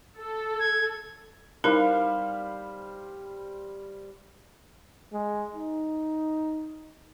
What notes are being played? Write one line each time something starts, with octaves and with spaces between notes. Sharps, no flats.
A4
G#6
G3 D#4 E4 A#4 C5 F5
G#3
D#4